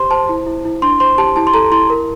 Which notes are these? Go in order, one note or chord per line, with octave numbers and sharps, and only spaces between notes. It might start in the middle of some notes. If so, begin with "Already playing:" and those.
Already playing: G4 C5 C6
C5 A5
E4
E4
E4
D4 C6
C5 C6
G4 A5
E4 A5
C6
A4 A#5
E4 C6
A#4